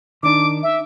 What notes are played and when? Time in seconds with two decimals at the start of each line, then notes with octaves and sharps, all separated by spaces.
0.23 D#3 D4 D6
0.63 E5